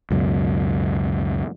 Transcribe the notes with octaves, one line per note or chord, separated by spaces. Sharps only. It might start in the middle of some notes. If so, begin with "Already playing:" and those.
C#2 F#2 B2